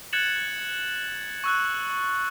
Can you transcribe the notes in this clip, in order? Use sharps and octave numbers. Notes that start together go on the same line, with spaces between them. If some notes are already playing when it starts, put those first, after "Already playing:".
F#6 G#6 A6 C#7 E7 F#7
C#6 E6 F#6